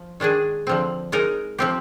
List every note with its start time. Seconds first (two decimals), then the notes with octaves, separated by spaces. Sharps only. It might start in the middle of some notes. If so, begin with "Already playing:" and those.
Already playing: F3
0.20 D#3 G#3 D4 G#4
0.67 D3 F3 C4
1.12 G#3 D#4 A#4
1.59 F3 C4 G4